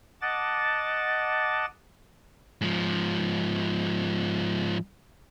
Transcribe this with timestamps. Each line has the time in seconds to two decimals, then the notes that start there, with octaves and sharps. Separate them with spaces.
0.22 D#5 F#5 A5 D6 A6
2.61 G#2 F3